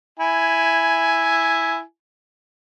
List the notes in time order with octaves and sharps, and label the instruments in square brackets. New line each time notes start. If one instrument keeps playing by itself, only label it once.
[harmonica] E4 G#5